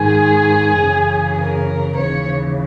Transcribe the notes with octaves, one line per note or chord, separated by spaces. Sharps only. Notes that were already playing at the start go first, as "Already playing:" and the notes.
Already playing: G#2 D#3 G#4
F#2 C#3 E3
A#4
D#2 C#3 E3 C#5